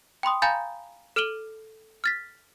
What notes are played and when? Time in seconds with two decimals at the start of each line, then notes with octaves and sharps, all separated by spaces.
0.23 G5 B5 C6 D#6
0.42 F5 G#5 A#5 B5 G6 A6
1.16 A4 F6 D7 D#7 F#7 G7
2.04 F6 A6 B6